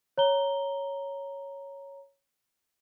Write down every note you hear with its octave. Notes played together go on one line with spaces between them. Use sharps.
C#5 A#5 G7